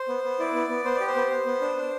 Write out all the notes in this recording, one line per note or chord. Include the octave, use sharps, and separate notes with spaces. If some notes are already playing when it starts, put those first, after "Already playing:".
Already playing: C5
B3
B3
E4 D5
B3
B3
B3 C5
G4 D5
C5
B3
B3
B3
D4
D4